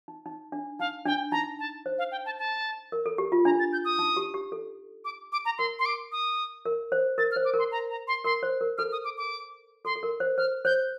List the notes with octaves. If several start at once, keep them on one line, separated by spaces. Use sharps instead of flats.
D#4
D#4
D4
D#4 F5
D4 G5
D#4 A#5
A5
C5
F5
G5
A5
A5
A#4
A4
G4
F4
D4 A#5
A6
G6
D#6
D#4
G4
G4
A4
D6
D6
A#5
A#4 C6
C6
D6
D#6
A#4
C5
A#4 A6
F6
C5
D6
A#4
C6
A#5
A#5
C6
A#4 C6
C5
A#4
A4 F6
D#6
D6
D6
A4 C6
A4
A#4
C5
C5 F6
C5 G6